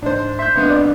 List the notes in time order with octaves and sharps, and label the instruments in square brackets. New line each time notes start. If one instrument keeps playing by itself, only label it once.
[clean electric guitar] G#2 [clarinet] G#3 [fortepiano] D4 C5
[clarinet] E5 [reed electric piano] C6 G6
[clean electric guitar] C2 D4 D#5 [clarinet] A#3 [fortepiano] B3
[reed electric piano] D5